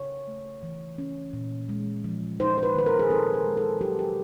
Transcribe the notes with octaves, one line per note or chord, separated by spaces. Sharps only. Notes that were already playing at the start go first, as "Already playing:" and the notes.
Already playing: C#3 C#5
A3
E3
C#4
A#2
G#3
F3
D#4 C5
C5
B4
D#3 B4
A#4
G#4
C4 A4
A#4
G#3
A4
F#3 G4
G4